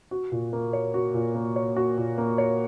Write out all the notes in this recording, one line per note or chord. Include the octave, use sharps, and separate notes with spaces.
F#4
A#2
A#3
C#5
F#4
A#2
A#3
C#5
F#4
A#2
A#3
C#5